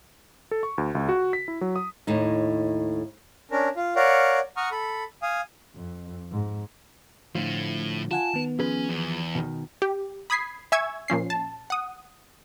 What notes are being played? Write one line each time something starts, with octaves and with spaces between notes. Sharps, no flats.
A4
C#6
D2
C#2
F#4
B6
E4
F#3
D#6
D#2 A2 D#4
C#4 D4 A#4
F4
A#4 C#5 D5 F5 F#5
F#5 A#5 C#6 D#6 F6
A4 B5
F5 G#5 D#6
F2
G#2
A2 D3 F3
F4 F#5 G#5 A5
D#3 B3
F3 C#4 G#4 B4
E2
B2 D#3
G4
B5 D#6 G#6 B6 C7
E5 G#5 C#6 E6 G#6
A#2 F3 C#4 C7
A5
F#5 D#6